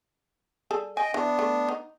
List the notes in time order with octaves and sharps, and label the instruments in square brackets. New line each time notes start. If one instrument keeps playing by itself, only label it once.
[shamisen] G3 G#4 A4
[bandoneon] D#5 G5 [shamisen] G#5
[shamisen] E3 [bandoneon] B3 D4
[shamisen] A3
D#4